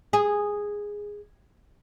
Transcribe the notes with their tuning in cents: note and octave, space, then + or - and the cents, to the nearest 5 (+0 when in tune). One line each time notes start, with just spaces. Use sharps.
G#4 -10